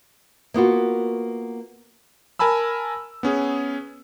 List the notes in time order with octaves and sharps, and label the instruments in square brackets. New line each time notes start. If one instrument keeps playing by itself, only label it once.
[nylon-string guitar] A#3 B3 F4 F#4
[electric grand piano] A#4 G#5 A5 B5 E6
B3 C#4 G#4